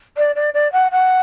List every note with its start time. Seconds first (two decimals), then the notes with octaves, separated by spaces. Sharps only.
0.17 D5
0.35 D5
0.54 D5
0.72 F#5
0.91 F#5